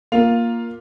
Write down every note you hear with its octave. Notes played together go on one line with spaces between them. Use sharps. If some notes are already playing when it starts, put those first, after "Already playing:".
A#3 F4 F5 F7